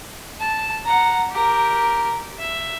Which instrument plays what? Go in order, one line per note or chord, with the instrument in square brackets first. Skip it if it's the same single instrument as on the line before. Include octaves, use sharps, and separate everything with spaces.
[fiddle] A5
F#5 A#5
G4 A#4
E5